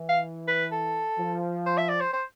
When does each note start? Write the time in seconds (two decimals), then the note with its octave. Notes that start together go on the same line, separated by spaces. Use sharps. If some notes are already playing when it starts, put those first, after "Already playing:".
Already playing: E3
0.09 F5
0.48 B4
0.72 A4
1.19 F3
1.66 C5
1.78 E5
1.89 D5
2.01 C5
2.13 C5